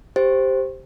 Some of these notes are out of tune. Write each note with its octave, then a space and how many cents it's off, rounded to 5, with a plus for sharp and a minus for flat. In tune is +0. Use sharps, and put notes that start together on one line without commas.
G4 +0 C5 +0